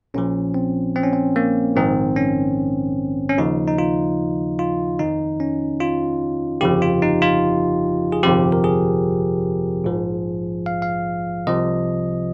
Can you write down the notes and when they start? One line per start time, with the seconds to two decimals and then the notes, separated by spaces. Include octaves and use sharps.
0.14 A#1 A#2 F3 C#4
0.54 C4
0.96 C4
1.03 C#4
1.13 C4
1.36 A#3
1.76 A#1 G#2 D#3 C4
2.16 C#4
3.29 C#4
3.38 D#2 C#3 F3 D#4
3.68 D#4
3.78 F4
4.59 F4
4.99 F2 D#3 D#4
5.40 C#4
5.80 F4
6.61 G1 F2 C#3 F3 G4
6.82 F4
7.02 D#4
7.22 F4
8.12 G#4
8.23 G1 F2 C3 F3 G4
8.52 A#4
8.64 G#4
9.84 A#1 G#2 F3
10.66 F5
10.82 F5
11.47 C2 C3 F3 D#5